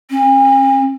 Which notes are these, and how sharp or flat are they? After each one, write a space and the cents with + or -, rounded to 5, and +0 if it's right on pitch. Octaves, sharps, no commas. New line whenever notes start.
C#4 -45